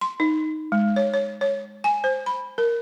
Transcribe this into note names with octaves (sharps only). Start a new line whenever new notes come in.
C6
D#4
G#3
C#5
C#5
C#5
G#5
C5
B5
A#4